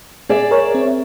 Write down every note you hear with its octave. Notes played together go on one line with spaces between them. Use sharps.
G#4 D5 E5
A#4 C#5
C4